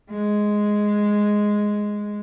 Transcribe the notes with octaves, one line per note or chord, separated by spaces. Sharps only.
G#3